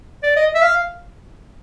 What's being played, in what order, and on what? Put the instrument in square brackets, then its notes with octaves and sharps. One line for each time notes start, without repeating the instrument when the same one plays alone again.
[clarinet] D5
D#5
E5
F5